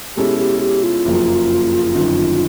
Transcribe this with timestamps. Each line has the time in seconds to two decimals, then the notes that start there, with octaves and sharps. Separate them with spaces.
0.17 B2 G#3 C#4 E4 G4 A4
0.39 G4
0.61 G4
0.83 F4
1.05 F#1 F2 C#3 F#3 A#3
1.95 G1 F#2 D#3